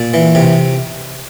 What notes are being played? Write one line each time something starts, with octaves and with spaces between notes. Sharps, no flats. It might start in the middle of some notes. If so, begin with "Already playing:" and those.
Already playing: A#2
E3
C3